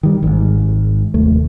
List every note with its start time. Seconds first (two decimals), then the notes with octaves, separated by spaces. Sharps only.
0.03 D#3 G3
0.23 G#1 G#2
1.14 F1 D#2 A3